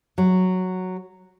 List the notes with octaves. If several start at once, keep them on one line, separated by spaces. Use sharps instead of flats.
F#3